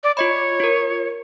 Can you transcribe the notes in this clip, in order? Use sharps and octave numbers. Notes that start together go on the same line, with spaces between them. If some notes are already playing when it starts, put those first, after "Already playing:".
D5
F4 C#5 D#5 B5
F4 A#4